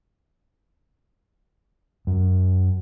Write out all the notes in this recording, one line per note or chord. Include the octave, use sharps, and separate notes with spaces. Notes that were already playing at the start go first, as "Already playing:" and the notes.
F#2